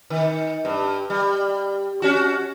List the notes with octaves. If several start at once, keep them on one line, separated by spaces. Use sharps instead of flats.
D#3
G2
G3
C#4 F#4